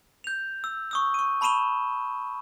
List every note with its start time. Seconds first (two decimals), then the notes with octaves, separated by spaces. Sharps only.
0.24 G6 F7
0.64 E6
0.91 C#6 D#6 E6
1.14 C#6 D#7
1.41 A5 B5 C#6 D#7 E7 G7